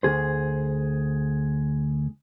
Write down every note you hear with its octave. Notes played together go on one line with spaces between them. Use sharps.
D2 G#4 C5